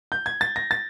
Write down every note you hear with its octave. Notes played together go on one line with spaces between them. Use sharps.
G6
G#6
A6
A#6
A6